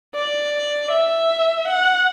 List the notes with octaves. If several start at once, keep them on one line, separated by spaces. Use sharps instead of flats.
D5
E5
F#5